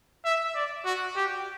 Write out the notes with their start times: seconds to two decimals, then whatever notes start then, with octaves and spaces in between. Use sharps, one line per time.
0.25 E5
0.55 D5
0.85 F#4
1.16 G4